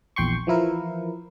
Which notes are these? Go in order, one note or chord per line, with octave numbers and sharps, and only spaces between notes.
A#1 E2 G5 C6 C#6
E3 F3 E4 A#4